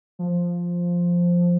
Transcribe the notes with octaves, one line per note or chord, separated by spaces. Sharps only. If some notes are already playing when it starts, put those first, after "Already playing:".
F3